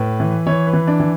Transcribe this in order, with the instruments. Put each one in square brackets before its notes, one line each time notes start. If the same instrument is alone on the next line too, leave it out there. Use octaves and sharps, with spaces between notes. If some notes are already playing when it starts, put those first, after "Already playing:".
Already playing: [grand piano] A2 B4
E3
E3 C#5
B4
E3
D4
E3